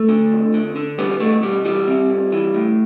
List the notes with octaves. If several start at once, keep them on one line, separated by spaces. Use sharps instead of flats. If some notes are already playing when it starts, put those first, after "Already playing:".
Already playing: A3
D3
F2
D3
D3
E2 G3 B3
B2 A3
B2 G3
E3 G3
C3
F2
E3
A2